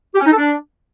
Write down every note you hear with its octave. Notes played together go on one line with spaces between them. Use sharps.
G4
C#4
D#4
A4
D4